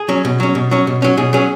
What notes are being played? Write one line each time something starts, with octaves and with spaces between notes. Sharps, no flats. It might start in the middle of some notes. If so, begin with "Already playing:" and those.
Already playing: G#4
F#3 C#4
B2
F#3 C#4
B2
F#3 C#4
B2
F#3 C#4
B2 G#4
F#3 C#4 G#4